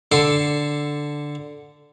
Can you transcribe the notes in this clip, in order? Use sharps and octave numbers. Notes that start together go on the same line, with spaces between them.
D3 A4 C6 D6